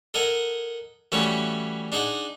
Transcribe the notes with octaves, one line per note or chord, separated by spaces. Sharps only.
A4 A#4 D#5 F#5 G#5
E3 G3 A3 C#4 F#4 C#5
D4 D#4 G#4 D#5 F#5